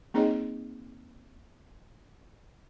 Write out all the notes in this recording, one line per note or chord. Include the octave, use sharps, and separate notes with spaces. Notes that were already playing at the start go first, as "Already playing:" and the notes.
A#3 C4 D#4 G#4 C#5 D#5